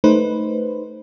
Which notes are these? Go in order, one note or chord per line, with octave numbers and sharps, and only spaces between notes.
A3 D#4 B4 C5